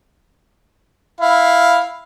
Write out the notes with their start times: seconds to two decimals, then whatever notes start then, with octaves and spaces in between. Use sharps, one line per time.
1.21 E4 F5